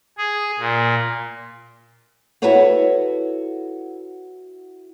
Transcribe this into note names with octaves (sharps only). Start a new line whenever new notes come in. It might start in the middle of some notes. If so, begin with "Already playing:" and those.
G#4
A#2
E4 F#4 A4 B4 C#5 F#5